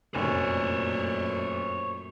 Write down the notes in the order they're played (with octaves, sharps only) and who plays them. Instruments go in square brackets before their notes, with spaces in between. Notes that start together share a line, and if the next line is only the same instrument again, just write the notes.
[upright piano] F1 C#4 G#5 [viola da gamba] F#2 A#2 A3 [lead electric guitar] C5 C#5